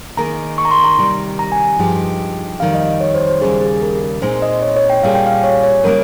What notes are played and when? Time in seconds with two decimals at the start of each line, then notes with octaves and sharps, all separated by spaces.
0.17 D#3 A#3 D#4 G#4 A#5
0.58 C#6
0.65 A#5
0.71 C6
0.84 A#5
0.98 C3 D#3 G3
1.39 A#5
1.52 G#5
1.79 G2 F3 G#3 D#4 G4
2.60 F2 D#3 G3 F5
2.74 D#5
3.00 C#5
3.14 C5
3.27 C5
3.41 D#2 C#3 G3 G#4
3.61 G#4
3.82 A#4
4.22 A#2 G#3 C4 D#4 C5
4.42 D#5
4.62 C#5
4.76 C#5
4.90 G5
5.03 A#2 G3 C#4 G#4 F5
5.15 G5
5.26 F5
5.44 C#5
5.64 C#5
5.84 C#3 G3 A#3 A#4